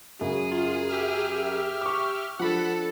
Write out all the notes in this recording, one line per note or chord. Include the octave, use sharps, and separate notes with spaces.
F#2 C#3 G#4
F4
G4 E5 F6
C#6 D6
F3 D4 A4 F#5 B5